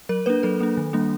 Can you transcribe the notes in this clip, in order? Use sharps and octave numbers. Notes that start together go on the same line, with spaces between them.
F#3 A#4
A#3 D4 B4
F#3 A4
A#3 D4
D#3
G3 A#3 D4